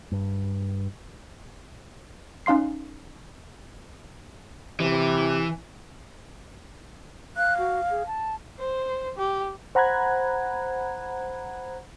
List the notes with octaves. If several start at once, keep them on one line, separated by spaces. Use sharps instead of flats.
G2
C#4 D#4 F5 C6 C7
C3 E3
F5 F#6
F#4
G#4
A5
C5
G4
C5 F#5 A#5 B5 F#6 G#6